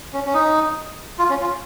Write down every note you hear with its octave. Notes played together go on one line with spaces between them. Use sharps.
C#4
C#4
D#4
F4
C#4
F4